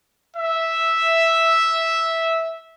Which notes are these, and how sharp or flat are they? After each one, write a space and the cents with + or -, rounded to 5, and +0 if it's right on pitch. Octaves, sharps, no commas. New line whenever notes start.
E5 -5